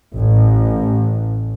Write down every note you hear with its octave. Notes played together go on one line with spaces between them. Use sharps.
A1